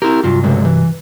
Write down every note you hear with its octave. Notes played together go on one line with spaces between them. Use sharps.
E4 G4 A#4
C2 G2 F#3 F4
C#3 G#3 A3
E3